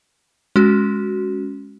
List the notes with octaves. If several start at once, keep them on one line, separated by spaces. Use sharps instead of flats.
G#3 C#4 F#4